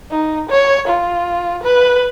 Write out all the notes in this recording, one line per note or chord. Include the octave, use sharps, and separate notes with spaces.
D#4
C#5
F4
B4